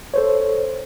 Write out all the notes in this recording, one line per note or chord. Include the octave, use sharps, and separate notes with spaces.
A4 C5 C#5